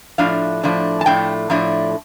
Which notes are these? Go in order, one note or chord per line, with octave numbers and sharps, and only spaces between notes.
A2 F3 A3 D4 F5
A2 F3 A3 D4
A5
A2 F3 A3 D4 G5
A2 F3 A3 D4